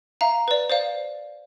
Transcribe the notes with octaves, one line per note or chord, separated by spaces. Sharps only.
E5 F5 A#5
B4 D5
C5 D5 F5